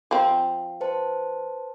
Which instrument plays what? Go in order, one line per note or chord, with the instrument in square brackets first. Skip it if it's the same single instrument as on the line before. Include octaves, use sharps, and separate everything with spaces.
[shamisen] F3 C4
[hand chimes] B4 C5 A5